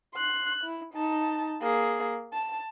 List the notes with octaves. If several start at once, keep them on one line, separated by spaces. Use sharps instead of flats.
C6 F#6
E4
D#4 A5
A#3 G#4
A5